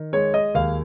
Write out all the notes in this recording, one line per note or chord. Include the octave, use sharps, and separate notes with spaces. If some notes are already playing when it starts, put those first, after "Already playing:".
Already playing: D#3
G#3 C#5
D#5
D#2 F5